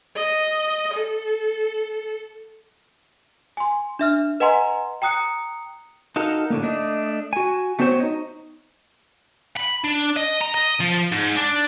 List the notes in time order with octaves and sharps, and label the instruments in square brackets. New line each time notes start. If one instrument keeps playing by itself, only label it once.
[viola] D#5
A4
[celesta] G#5 C6
D4 E5 F6
B4 D#5 F#5 G#5 A#5 C6
G5 A#5 D#6 F#6 C#7
[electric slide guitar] D#4 F#4 A4 A#4 F5
A2 D3 A#3
A3 D4 D#5
F#4 G#5
A3 B3 C4 F#4 C5 C#5
D#4 D#5
[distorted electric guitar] B5
D4
D#5
A#5
D#5
F3
G#2
D4